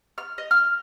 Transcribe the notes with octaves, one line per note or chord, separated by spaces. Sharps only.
F6
D#5
F6